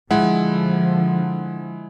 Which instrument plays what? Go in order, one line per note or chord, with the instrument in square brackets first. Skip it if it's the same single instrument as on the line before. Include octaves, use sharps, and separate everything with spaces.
[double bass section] D3 F3 [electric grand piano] G#3 E4 F#5